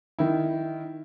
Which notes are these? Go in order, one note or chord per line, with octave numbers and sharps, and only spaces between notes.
D#3 E4